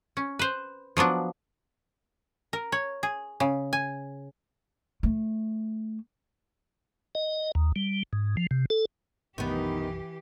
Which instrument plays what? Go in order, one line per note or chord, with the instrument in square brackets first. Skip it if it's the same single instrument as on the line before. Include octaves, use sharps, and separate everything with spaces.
[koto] C#4
B4 C5
F3 F#3 B3 D4
A#4
C#5
G#4
C#3
G#5
[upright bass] A3
[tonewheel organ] D#5
D#2
G3
G#2
F3
C3
A4
[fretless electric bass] B1 F#2 [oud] D#3 B3 [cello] E3 G4 [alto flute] D#4